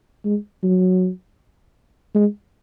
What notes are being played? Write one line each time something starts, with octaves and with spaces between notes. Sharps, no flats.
G#3
F#3
G#3